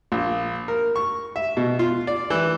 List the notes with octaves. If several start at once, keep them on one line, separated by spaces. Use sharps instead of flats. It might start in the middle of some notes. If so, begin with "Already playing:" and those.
A#1
A#4
C#6
E5
B2
F4
D5
E3